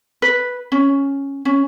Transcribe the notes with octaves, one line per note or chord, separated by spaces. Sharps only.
B4
C#4
C#4